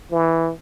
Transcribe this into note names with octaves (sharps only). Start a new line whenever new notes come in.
E3